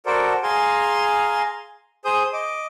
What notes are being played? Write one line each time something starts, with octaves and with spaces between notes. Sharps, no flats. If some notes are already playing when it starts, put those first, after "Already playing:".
F#4 A4 A#4 C5 D5
G#4 F5 G#5 A#5 C6
G#4 C5 D#6 G6
D#5 D6